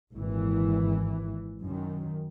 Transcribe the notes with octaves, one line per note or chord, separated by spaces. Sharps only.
G#1 A#2 E3
F#2 D#3